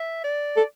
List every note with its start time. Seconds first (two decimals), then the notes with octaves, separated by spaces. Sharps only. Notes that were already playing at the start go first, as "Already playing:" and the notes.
Already playing: E5
0.24 D5
0.57 A4